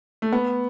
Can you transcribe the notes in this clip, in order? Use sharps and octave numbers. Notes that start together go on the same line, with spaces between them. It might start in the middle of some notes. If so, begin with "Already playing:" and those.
A3
B3